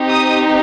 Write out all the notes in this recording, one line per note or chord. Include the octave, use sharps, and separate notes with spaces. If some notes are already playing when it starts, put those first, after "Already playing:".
Already playing: C4 D#4 G4
D#6